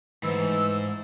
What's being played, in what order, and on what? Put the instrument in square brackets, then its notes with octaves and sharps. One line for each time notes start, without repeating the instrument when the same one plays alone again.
[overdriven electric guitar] G#2 [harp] E3 A3 [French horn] B4 [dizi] E6